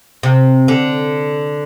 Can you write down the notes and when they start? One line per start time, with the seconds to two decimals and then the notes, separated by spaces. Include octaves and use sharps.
0.23 C3
0.68 D3